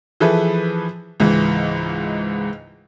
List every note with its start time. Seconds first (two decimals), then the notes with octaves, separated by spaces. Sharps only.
0.20 E3 F3 G#4 A4 B4 E5
1.20 C#2 G#2 E3